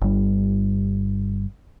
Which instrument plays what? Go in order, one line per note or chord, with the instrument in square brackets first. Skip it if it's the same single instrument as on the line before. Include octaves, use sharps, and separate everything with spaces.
[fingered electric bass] G1 G3